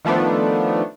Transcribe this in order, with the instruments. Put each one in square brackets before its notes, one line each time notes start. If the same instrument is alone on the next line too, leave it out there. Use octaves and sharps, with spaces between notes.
[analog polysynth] D#3 F3 A3 B3 D4